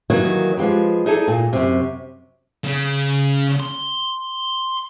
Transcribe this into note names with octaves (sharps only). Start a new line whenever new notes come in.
D#3 E3 F#3 G3 A#3 B3
F3 G#3 F4 G4 B4
D#4 E4 G#4 A4 D5
A#2
F#2 C3
C#3 C#4
C6